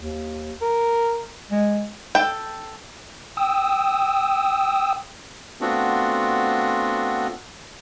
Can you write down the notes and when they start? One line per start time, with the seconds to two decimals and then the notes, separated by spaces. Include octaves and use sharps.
0.01 D#2
0.61 A#4
1.51 G#3
2.15 A4 G5
3.37 G5 D#6 E6
5.61 A3 B3 C4 D4 F4 F#4